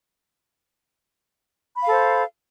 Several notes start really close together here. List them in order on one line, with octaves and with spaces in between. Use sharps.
B5 F5 A4 C5